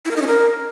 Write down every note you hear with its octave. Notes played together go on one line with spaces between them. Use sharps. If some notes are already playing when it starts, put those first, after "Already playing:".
E4
A#4
D#4
C#4
A#4